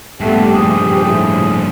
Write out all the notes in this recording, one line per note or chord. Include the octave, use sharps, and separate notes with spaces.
G2 A#2 A3 B3 G4
F3 G#4
A2